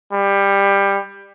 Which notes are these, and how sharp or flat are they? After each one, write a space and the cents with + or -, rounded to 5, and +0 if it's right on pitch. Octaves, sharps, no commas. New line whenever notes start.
G3 +15